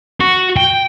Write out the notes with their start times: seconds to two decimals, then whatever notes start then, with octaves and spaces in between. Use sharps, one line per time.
0.21 F#4
0.57 G5